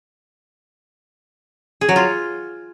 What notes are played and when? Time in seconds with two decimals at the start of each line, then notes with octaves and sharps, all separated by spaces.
1.81 G#4
1.89 F#3
1.96 F4